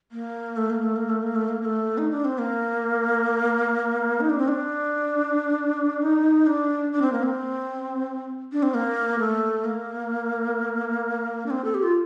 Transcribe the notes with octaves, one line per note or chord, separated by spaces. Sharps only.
A#3
A3
A#3
A3
A#3
A3
A#3
A3
A#3
A#3
A3
D#4
D4
C4
A#3
D#4
D4
C4
D4
D#4
D4
D4
C4
A#3
C4
D4
C4
A#3
A3
A#3
D4
C4
A4
G4
F4